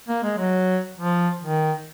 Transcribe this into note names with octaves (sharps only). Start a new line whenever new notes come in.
A#3
G#3
F#3
F3
D#3